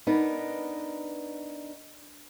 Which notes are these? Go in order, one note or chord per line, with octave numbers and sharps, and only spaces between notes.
B3 D4 D#4 A#4 B4